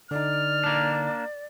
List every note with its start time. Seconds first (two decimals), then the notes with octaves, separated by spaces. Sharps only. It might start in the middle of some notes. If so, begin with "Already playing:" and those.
0.11 D3 D#4 D5 F6
0.64 A#3 D4